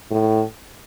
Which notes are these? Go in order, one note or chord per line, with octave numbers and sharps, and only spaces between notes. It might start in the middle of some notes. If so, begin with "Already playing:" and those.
A2